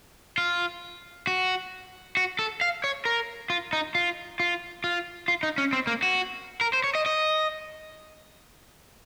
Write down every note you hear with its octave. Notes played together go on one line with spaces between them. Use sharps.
F4
F#4
F#4
A4
F5
C#5
A#4
F4
D#4
F4
F4
F4
F4
D#4
C#4
C4
A#3
F#4
A#4
C5
C#5
D#5
D#5